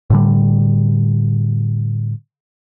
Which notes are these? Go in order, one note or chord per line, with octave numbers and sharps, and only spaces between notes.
A2 D3 G3